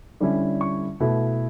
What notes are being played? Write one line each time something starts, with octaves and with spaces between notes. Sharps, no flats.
D3 G3 C#4 E4
C#6
B2 A3 E4